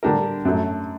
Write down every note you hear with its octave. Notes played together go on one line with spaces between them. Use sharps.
D3 G3 D4 G4 A#4
F#2 F#3 A3